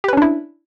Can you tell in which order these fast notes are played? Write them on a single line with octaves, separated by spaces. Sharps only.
G4 B4 C#4 D4 E4